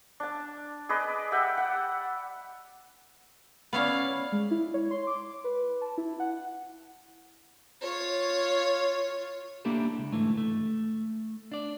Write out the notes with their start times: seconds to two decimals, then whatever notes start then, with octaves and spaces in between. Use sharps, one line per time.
0.20 D4 A5
0.89 G#4 B4 D5 D#5
1.32 G4 E5 F#5 G5
1.57 F#5
3.73 B3 C#4 E4 D5 F5
4.32 G#3
4.51 E4
4.74 C#5
4.91 C6
5.07 D6
5.44 B4
5.81 A5
5.98 E4
6.20 F#5
7.81 F4 C#5
9.65 A#3 D4 E4 G4 A4
9.98 C#2
10.12 G#2 B2 D3 E3 A3
10.37 A3
11.52 D4 D5